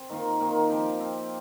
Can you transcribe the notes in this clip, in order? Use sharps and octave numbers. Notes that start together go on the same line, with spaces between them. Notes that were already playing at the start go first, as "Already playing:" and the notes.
Already playing: C4
D#3 A#3 F4
D#3 A#3 F4
F3 C4 G4
F3 C4 G4